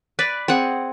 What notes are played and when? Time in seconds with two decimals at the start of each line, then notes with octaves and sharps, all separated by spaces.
0.19 B4 D5
0.48 C4 G#4 F#5